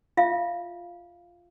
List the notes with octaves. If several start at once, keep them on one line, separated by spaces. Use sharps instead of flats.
F4 E5 F5